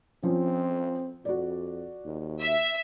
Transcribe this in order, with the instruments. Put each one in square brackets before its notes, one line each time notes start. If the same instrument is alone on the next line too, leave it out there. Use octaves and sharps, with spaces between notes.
[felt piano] F3 C#4 [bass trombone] C4
[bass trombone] F2 [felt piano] F#4 D5
[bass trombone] D#2
[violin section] E5